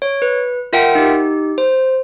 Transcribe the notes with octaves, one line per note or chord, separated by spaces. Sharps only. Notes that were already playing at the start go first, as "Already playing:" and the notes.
C#5
B4
F4 A#4 E5 F#5 G5
D#4 G4
C5